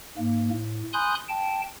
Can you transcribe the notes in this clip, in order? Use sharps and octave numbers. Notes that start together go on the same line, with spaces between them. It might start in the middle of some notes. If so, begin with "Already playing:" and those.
G#2 A#3
A2
G#5 B5 C6 D#6 F#6 G6
G5 A5